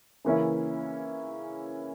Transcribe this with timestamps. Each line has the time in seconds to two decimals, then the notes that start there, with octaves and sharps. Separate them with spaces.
0.25 C#3 E3 A#3 C#4 E4